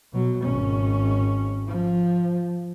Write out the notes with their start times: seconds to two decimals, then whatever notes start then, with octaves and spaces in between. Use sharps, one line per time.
0.12 B2 F#3
0.45 G#1 C#4
1.67 F3